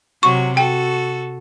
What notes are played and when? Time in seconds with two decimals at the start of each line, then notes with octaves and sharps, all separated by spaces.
0.23 C3 F#3 F#4 C#6
0.57 F#4 A4 G5